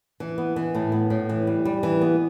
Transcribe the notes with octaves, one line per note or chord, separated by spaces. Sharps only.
E3
B3
E3
A2
B3
A2
E3
G3
G3
E3
B3